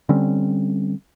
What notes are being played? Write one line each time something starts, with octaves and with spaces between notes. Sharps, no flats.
D3 G3 C4 C#4